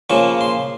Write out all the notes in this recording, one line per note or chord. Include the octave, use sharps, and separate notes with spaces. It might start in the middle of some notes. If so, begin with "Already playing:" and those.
C#3 F3 A#3 C#6
C6